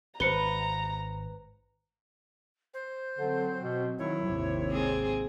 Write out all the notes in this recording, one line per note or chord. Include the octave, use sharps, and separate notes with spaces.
G#1 B4 C5 A#5 C#7 G7
C5
D3 F#3 C4
B2
D#3 F#3 E4 C#5
G#1 D#2 C3
G#2 C4 G#4